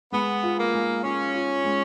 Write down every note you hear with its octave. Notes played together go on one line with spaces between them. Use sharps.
G#3 B3
F4
A#3
G#3
C#4 F4
F4
G#3